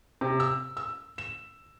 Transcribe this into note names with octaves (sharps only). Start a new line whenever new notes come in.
C3
E6
E6
E7